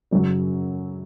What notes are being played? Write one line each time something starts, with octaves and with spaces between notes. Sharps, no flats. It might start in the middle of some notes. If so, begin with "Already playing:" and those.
F#2 C#3 F#3 C#5